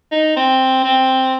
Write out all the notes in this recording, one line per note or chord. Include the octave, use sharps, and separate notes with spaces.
D#4
C4
C4